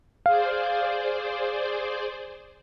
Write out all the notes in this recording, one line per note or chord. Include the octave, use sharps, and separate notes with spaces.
G#4 C5 D5 F5